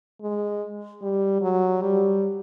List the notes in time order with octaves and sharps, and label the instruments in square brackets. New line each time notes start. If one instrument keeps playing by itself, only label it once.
[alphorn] G#3
G3
F#3
G3